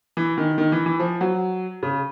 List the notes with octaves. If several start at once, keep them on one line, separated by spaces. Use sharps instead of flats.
E3
D#3
D#3
E3
E3
F3
F#3
C#3